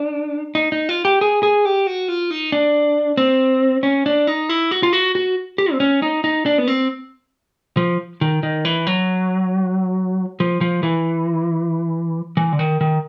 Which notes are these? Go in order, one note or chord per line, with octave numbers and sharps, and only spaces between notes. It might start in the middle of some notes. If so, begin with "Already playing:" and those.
Already playing: D4
D#4
D#4
F4
G4
G#4
G#4
G4
F#4
F4
D#4
D4
C4
C#4
D4
D#4
E4
F#4
F4
F#4
F#4
G4
C4
C#4
D#4
D#4
D4
B3
C4
F3
D#3
D#3
E3
F#3
F3
F3
E3
E3
D3
D#3
D#3